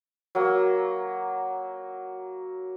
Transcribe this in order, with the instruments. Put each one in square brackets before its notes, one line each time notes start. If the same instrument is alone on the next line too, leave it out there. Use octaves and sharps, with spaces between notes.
[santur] F#3 A#3